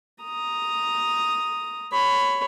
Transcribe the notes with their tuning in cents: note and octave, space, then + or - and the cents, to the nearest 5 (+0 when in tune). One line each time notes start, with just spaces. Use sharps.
A#5 +0 D#6 +0
C#5 +0 B5 +15